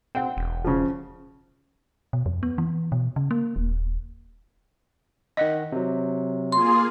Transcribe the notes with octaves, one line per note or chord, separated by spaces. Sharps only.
C4 F#5 G5
E1
C#3 F3
B2
F2
B3
E3
B2
C#3
A#3
D#1
D#3 D#5 F#5 A#6
C3 F#3
A#3 F4 G#4 C6